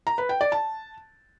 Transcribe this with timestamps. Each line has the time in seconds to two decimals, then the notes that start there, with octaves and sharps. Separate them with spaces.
0.07 A#5
0.18 B4
0.29 G5
0.41 D5
0.52 A5